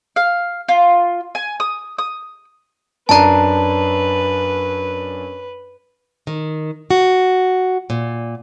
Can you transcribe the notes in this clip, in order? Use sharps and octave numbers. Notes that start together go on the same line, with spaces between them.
F5
F4
G#5
D#6
D#6
F#2 D4 B4 A5 A#5
D#3
F#4
A#2